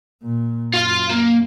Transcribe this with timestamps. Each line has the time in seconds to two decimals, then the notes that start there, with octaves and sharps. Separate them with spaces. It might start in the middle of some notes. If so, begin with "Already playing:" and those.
0.23 A#2
0.74 F#2 F4 F5
1.10 A#3